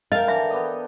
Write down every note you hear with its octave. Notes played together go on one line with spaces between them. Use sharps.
A4 A#4 D#5 F5 G5
D3 E3 E5
B3 G4 D#5